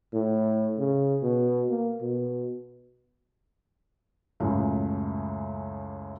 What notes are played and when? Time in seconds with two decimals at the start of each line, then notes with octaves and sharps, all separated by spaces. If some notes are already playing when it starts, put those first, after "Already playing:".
0.13 A2
0.79 C#3
1.22 B2
1.69 A#3
2.01 B2
4.40 C#2 F#2 A2